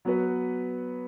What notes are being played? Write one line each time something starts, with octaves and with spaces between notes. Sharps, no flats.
F#3 B3 F#4 B4